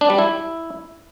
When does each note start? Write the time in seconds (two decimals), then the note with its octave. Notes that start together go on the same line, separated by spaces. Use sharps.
0.01 D4
0.10 G3
0.18 E4